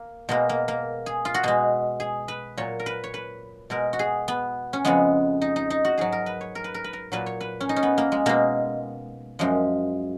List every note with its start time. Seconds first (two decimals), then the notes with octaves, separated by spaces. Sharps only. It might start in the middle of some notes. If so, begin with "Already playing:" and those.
Already playing: A#3
0.29 B2 G#3 A#3
0.49 A#3
0.68 A#3
1.06 G#4
1.25 F4
1.34 F#4
1.43 B2 G#3 G#4
2.00 G#4
2.28 B4
2.57 A#2 F#3 C#5
2.80 A#4
2.86 B4
3.04 C#5
3.14 B4
3.70 B2 G#3 A#4
3.93 F#4
3.99 G#4
4.28 B3
4.73 C#4
4.85 F2 C#3 G#3 B3
5.42 D#4
5.56 D#4
5.70 D#4
5.85 F#4
5.98 G#2 F#3 G#4
6.12 A#4
6.26 B4
6.41 C#5
6.55 A#4
6.64 B4
6.74 A#4
6.84 B4
6.93 A#4
7.12 A#2 F#3 B4
7.26 C#5
7.41 B4
7.61 C#4
7.69 D#4
7.76 C#4
7.83 B3
7.98 A#3
8.12 G#3
8.26 B2 G#3 A#3
9.39 F#2 F3 G#3